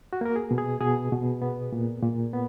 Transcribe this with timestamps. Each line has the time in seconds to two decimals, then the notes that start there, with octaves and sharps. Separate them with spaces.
0.13 F#4
0.21 A#3 A#4
0.36 G#4
0.51 B2
0.58 G#4
0.81 B2 G#4
1.12 B2
1.42 B3
1.72 A#2
2.02 A#2
2.33 B3